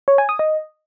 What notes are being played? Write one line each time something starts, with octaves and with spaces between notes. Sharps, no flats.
C#5
G#5
D#6
D#5